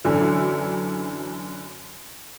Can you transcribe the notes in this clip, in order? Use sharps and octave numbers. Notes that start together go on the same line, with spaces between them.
F#2 D3 E3 F#3